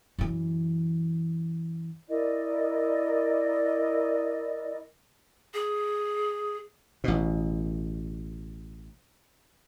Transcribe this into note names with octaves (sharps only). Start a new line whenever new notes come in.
F#2 E3
E4 A#4 D5 D#5
G#4
A1 B2